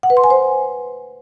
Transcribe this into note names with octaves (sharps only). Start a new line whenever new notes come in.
F#5
B4
C6
G#5
C5